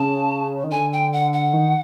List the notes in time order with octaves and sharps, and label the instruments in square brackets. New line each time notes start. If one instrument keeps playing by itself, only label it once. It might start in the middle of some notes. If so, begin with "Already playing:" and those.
Already playing: [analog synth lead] C#3 [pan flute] A5
[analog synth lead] D#3
[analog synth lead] D3 [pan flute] G#5
[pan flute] G5
F#5
F#5
[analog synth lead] D#3